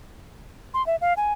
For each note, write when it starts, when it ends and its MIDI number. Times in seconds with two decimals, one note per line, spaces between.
0.74 0.85 84
0.87 0.96 76
1.01 1.13 77
1.17 1.33 80